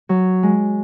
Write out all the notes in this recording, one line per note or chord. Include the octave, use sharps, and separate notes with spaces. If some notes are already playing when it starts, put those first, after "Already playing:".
F#3
G#3